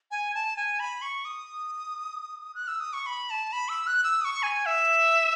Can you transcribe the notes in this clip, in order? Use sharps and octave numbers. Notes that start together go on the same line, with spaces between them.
G#5
A5
G#5
B5
C#6
D#6
F#6
E6
D#6
C#6
B5
A5
B5
E6
F#6
E6
D#6
C#6
G#5
E5